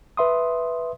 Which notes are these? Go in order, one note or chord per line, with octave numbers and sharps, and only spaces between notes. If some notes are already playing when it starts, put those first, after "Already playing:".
B4 E5 C6 D#6